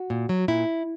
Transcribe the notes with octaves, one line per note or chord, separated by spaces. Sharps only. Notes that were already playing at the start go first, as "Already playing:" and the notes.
Already playing: F#4
A#2
F#3
A#2 E4